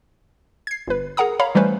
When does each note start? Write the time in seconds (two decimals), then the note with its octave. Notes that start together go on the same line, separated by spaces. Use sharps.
0.67 G#6 C7
0.88 G1 B4
1.17 G#4 A#4 F#5 A#5 D#6
1.40 C#5 F5 A#5 B5
1.55 E3 G3 A3 C#4 B4 C5